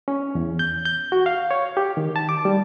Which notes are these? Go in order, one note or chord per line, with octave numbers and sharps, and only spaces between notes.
C#4
E2
G6
G6
F#4
F5
C#5
G4
D#3
A5
D6
G3